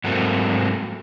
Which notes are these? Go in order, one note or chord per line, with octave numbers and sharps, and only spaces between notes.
G#2 F#3 A3 A#3 C4